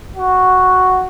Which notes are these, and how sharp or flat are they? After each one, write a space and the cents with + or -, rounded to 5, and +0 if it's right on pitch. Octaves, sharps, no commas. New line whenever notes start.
F#4 +0